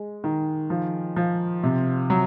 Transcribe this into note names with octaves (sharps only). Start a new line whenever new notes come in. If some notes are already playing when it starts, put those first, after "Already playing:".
Already playing: G#3
D#3
F3
F3
C3
F#3